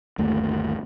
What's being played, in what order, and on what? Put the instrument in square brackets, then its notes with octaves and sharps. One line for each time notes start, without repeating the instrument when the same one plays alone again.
[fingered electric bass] G1 D#2 A3